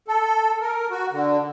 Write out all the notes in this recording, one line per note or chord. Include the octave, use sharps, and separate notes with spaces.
A4
A#4
F#4
D3